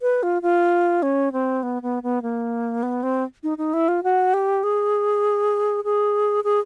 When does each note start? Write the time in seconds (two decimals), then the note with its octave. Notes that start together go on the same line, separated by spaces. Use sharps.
0.02 B4
0.23 F4
0.42 F4
1.02 C#4
1.32 C4
1.63 B3
1.82 B3
2.03 B3
2.22 A#3
2.83 B3
3.03 C4
3.43 D#4
3.58 D#4
3.73 E4
3.88 F4
4.03 F#4
4.34 G4
4.63 G#4
5.84 G#4
6.44 G#4